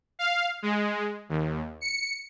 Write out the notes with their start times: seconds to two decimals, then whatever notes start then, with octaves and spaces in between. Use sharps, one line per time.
0.19 F5
0.62 G#3
1.29 D#2
1.81 C#7